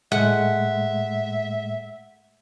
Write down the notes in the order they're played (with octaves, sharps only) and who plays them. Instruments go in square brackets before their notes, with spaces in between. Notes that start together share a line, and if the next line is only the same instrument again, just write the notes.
[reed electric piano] A2 G#3 A3 [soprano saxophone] E5 [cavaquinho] F#5